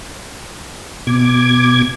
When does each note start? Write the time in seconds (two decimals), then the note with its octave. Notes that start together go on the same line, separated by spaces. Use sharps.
1.07 B2 D6 G#6